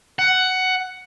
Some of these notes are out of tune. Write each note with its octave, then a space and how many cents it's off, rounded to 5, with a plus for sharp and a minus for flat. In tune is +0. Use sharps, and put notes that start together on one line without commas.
F#5 +10